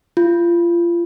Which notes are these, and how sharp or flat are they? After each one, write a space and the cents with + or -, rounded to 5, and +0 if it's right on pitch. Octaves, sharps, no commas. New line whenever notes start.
F4 -30